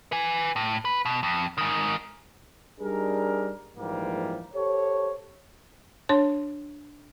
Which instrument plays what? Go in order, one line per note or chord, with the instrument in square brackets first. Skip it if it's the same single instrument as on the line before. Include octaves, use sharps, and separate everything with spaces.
[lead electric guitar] B4 G#5
A2
B4
B2
F2
G#2 D#3
[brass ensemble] G3 D4 D#4 G#4 A#4
A#1 G#2 E3 F3 G3 A#3
G4 A4 C5 C#5
[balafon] D4 C#5 C6